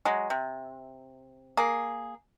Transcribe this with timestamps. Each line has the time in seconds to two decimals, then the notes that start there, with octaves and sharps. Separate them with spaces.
0.05 F#3 G#3
0.30 C3
1.57 A#3 G#4